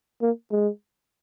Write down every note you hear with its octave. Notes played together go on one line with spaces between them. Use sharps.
A#3
G#3